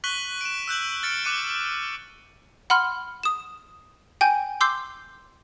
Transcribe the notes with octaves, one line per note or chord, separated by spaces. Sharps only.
C#6 F#6 B6 D#7 F#7 G7
D7 E7
E6 F#6 G6 F#7
F6 A6 C#7 D7
D6 F#6 C#7 D#7
F#5 B5 C6 F6
D#6 E7
G5 G#5 G6
C6 D6 E6 G6 C7